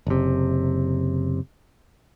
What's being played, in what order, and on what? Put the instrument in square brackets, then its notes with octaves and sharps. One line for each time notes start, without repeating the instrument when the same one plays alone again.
[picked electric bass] F#1 C3